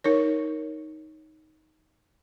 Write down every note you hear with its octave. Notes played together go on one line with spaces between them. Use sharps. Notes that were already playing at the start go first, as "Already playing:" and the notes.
D#4 A#4 C#5